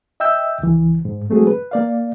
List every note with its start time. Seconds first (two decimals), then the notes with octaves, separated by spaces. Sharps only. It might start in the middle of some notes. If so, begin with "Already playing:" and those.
0.20 D#5 E5 G5 E6 G6
0.60 C#2 E3
1.05 G#2
1.30 F#3 G#3 A3 C4 F#4 G#4
1.47 B4
1.71 A#3 D5 F5